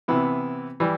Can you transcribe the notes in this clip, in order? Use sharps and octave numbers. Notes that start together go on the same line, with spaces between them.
C3 E3 B3 E4
E3 G3